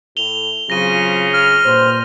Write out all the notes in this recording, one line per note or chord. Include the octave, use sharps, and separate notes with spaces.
A2 F7 G7
C#3 F#3 C4 F4 A#6 D#7
F6
G2 A#2 C5